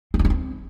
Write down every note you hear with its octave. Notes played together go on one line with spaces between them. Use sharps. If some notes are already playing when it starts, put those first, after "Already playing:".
C4
F3
D4
C4